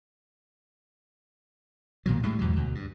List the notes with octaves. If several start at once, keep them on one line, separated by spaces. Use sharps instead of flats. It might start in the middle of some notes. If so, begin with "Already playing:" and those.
B1 A#2 D#3 F#3
D2 A2 G3 G#3
E2 G#2 B2 F#3
D2 B2
G2